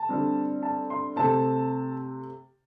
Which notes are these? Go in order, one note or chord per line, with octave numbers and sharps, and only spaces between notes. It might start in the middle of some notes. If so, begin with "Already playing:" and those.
Already playing: A5
D3 G3 C4
A5
C6
C3 A3 C4 A5